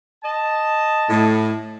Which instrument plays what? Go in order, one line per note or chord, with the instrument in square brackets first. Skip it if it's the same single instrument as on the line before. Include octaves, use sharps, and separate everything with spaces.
[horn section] D#5 A5
[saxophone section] A2